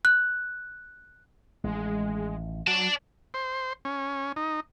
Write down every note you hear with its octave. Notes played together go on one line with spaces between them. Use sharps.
F#6
A1 D#3 G#3
F#3 D5 A5
C5
C#4
D#4